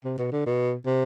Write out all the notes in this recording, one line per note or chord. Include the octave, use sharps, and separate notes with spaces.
C3
B2
D3
B2
C3